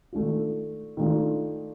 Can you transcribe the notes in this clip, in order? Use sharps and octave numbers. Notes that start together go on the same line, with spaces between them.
D#3 A3 D4 F4
D#3 A3 D4 F4